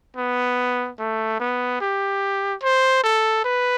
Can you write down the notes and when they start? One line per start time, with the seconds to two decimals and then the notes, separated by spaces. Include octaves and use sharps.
0.17 B3
0.99 A3
1.40 B3
1.81 G4
2.63 C5
3.04 A4
3.45 B4